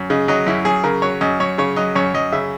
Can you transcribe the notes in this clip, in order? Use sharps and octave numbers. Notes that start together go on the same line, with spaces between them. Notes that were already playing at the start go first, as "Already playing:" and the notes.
Already playing: F#2
C#3 D#5
F#3 D#5
F#2 E4
F#2 G#4
C#3 A#4
F#3 C#5
F#2 D#5
F#2 C#5
C#3 C#5
F#3 D#5
F#2 C#5
F#2 D#5
C#3 E5